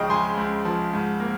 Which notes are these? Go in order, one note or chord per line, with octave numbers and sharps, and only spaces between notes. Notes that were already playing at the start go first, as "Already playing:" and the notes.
Already playing: C#2 C#3 F3 D#5 F5 G5
G#3 G#5 C6
C#2
F3
G#2
A#3